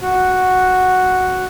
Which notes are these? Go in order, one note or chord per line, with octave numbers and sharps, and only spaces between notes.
F#4